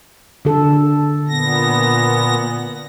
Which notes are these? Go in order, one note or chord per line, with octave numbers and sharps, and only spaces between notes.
D3 A4
A#2 B3 A#6